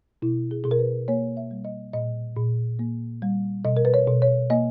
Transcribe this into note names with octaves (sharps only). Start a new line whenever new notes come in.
B2 E4
G#4
B2 G#4
A#4
B4
A#3 C#5
E5
G3
D#5
A#2 D#5
A#2
A#3
G3
B2 D#5
A#4
B4
C#5
B2
C#5
A#3 D#5